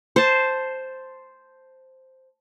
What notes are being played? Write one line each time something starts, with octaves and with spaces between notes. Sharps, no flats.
C5 A5